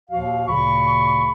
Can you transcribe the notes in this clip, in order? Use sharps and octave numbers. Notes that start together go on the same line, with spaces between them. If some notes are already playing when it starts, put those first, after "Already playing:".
D#2 A#2 F3 F#4 F5
D2 A#2 C#3 B5 C#6